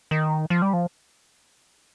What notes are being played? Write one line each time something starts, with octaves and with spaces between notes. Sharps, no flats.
D#3
F3
G3
F3